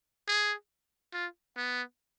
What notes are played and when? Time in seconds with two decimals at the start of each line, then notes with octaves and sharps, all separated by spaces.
0.28 G#4
1.14 F4
1.57 B3